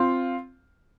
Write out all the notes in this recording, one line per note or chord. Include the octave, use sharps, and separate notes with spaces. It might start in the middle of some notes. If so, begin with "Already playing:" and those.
Already playing: C4 F4